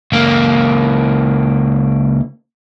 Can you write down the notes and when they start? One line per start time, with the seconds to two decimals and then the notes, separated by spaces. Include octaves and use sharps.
0.12 C#2 A#3